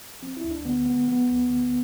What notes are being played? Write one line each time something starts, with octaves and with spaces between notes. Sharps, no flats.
F3 C4
E4
D2
D4
D3 B3
G#3 B3
F3 B3
D2
D3